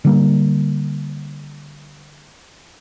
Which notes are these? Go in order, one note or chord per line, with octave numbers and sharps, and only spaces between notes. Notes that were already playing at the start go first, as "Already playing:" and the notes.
D3 G3 A#3